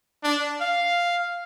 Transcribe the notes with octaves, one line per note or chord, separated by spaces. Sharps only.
D4
F5